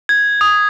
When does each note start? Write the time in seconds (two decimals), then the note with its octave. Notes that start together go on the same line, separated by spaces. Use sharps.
0.09 G#6
0.41 D#6